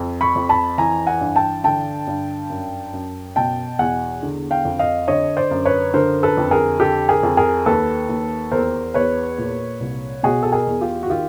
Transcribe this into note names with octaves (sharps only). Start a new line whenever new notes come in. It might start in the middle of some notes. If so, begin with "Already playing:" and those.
Already playing: F2
B5 C#6
F2
A5 B5
E3 G#5 A#5
F#5 G#5
G2
G5 A5
D3 G5 A5
G2
F#2
F#2
B2 G5 A5
E2 F#5 G#5
D3
F5 G5
F2
D#5 F5
D3 C#5 D#5
C5 D5
F#2
B4 C#5
D3 A#4 C5
A4 B4
F2
G#4 A#4
D3 G4 A4
G#4 A#4
F2
G#4 A#4
D#2 A4 B4
D#2
E2 A#4 C5
E2 B4 C#5
A#2
C2
B2 F#4 G#4
A4
G#4 A#4
E2
F4 G4
F#4
D#3 F4 G4